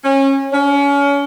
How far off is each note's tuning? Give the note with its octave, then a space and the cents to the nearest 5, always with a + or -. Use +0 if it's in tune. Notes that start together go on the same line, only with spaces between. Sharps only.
C#4 -25
C#4 +30